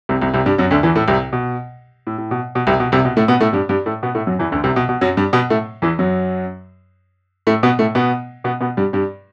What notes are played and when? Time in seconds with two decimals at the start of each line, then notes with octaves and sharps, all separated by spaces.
0.09 C2 C3
0.22 C2 C3
0.34 C2 C3
0.46 G2 G3
0.58 F#2 F#3
0.71 D2 D3
0.83 E2 E3
0.96 A2 A3
1.08 C2 C3
1.33 B2
2.07 A2
2.18 A2
2.31 B2
2.55 B2
2.67 C2 C3
2.80 B2
2.92 C2 C3
3.05 B2
3.17 A2 A3
3.28 B2 B3
3.41 A2 A3
3.53 G2 G3
3.69 G2 G3
3.86 A2 A3
4.03 B2 B3
4.15 A2 A3
4.27 F#2 F#3
4.39 E2 E3
4.52 D2 D3
4.64 C2 C3
4.76 B2
4.89 B2
5.01 F#2 F#3
5.17 G2 G3
5.33 B2 B3
5.50 A2 A3
5.82 E2 E3
5.99 F#2 F#3
7.47 A2 A3
7.63 B2 B3
7.79 A2 A3
7.95 B2 B3
8.44 B2 B3
8.60 B2 B3
8.77 G2 G3
8.93 G2 G3